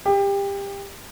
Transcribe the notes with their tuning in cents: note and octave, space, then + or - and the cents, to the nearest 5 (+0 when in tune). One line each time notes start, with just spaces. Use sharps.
G4 +25